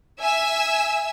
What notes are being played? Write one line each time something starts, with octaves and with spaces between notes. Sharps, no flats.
E5 G#5 E6